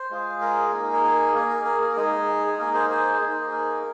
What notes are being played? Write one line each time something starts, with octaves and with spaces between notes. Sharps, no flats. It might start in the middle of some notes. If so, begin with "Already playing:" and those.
Already playing: C5
G#3 F4 G#4
A#4
A#3 D#4 G#4
A#4
G#4
A#3 G#4 A#4
A#4
A#4
G#4
A#4
G#3 D#4 G#4
G#4
A#3 D#4 G#4 A#4
G#4 C5
G#4 C5
A#3 D#4 G#4
A#4